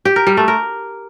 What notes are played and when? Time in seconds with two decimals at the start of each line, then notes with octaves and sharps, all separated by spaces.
0.05 G4
0.16 A#4
0.27 G3
0.37 A3
0.48 A#4